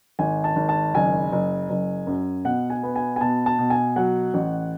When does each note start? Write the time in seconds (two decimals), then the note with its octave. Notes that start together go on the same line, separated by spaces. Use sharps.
0.19 G#1 G#5
0.44 A5
0.56 G#1
0.69 A5
0.94 F#1 G#5
1.32 F#1
1.70 F#1
2.07 F#2
2.45 B2 F#5
2.70 G#5
2.83 B3
2.96 G#5
3.16 G#5
3.20 B2 A5
3.46 A5
3.58 B2
3.70 G#5
3.96 F#3 F#5
4.34 A1